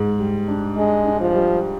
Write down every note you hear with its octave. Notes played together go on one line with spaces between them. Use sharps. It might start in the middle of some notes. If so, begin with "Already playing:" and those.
Already playing: G#2
G3
D4
G#3 D4
D4
F3
G3